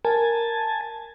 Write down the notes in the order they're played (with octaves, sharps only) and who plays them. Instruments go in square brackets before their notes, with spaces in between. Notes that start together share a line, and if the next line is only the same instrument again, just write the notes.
[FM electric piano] A#4 [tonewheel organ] G#5 A5